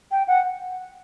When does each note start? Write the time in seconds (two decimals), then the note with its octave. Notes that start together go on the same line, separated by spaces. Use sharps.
0.11 G5
0.27 F#5